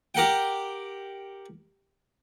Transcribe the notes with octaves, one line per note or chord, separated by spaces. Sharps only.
G4 A#4 F#5 G5